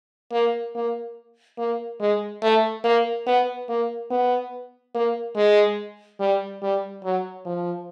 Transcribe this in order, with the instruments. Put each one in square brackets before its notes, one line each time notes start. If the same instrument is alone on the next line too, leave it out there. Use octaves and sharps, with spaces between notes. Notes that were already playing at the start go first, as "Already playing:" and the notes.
[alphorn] A#3
A#3
A#3
G#3
A3
A#3
B3
A#3
B3
A#3
G#3
G3
G3
F#3
F3